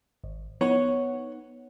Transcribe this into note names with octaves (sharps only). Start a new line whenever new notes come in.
G#1
B3 D#4 C#5 F#5